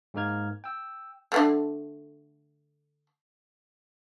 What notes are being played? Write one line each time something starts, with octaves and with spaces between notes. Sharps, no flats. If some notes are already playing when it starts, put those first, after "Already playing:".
G#2 G#3 A#3 D#4 F6 G#6
G5 E6
D3 F#3 A3